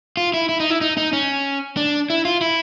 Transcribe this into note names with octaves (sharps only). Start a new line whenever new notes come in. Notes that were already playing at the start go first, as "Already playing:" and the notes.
F4
E4
E4
D#4
E4
D#4
D#4
C#4
D4
E4
F4
E4